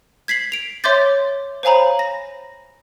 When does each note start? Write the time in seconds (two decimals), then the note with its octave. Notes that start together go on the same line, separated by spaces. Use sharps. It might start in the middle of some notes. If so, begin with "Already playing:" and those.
0.28 G#6 B6 C7 F#7
0.52 D7 F7
0.84 C#5 E5 C6 D6 G6 A6
1.63 C5 C#5 F5 G#5 A#5 B5
1.99 A#6